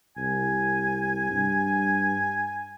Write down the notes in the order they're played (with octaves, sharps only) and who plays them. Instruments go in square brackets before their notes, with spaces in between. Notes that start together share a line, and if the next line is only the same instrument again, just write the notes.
[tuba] C2 [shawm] G#5
[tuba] G2